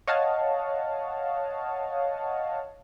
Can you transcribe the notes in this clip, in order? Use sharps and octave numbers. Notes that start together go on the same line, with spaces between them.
C#5 D#5 F5 F#5 A5